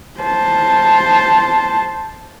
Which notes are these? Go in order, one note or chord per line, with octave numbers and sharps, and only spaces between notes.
C5 A5